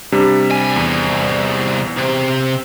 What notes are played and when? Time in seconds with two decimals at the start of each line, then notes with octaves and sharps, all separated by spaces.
0.12 C3 G3 D4
0.51 C2 G#5
0.76 E2
1.97 C3